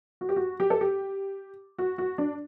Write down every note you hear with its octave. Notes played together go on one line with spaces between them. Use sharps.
F#4
G4
F#4
G4
A4
G4
F#4
F#4
D4